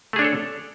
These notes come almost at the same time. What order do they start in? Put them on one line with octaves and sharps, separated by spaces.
A3 G#4 D4 C#5 A4